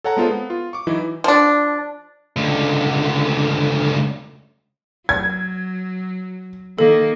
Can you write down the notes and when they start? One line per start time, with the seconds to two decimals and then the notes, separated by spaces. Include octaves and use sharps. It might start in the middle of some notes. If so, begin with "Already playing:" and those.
0.04 A4 C#5 F#5 A5 A#5
0.17 G#3 B3 F4 A4 C5
0.31 B3
0.50 F4
0.73 C#6 D6
0.87 E3 F#3 D#4 E4
1.24 F3 D4
2.36 C#2 D3
5.09 F#3 G#6
6.79 D#3 A#3 A4